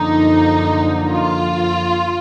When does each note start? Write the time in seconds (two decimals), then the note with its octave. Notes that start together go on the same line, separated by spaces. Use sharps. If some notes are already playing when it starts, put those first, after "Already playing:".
Already playing: F#2 D3 F3 A#3 D#4
1.09 F4